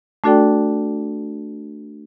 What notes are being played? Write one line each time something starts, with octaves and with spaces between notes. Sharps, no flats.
A3 D4 F#4 A4 D5 G5